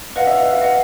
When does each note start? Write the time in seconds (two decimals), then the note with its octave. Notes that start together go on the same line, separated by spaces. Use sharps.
0.16 B4 D#5 F5 F#5
0.27 E5
0.37 F5
0.49 F5
0.60 B4 D#5 F#5